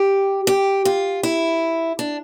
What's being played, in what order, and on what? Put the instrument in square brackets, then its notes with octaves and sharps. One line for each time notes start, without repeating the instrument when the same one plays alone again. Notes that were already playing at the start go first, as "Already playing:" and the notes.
Already playing: [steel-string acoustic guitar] G4
G4
F4
E4
D4